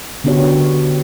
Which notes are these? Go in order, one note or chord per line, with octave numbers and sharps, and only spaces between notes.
D3 B3 D4 F#4 G4 C#5